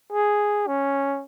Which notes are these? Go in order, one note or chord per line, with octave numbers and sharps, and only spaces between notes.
G#4
C#4